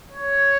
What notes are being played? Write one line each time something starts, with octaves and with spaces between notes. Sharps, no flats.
C#5